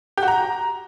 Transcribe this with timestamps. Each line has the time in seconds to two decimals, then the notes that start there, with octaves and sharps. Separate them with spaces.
0.17 G4
0.23 F#4
0.28 A#5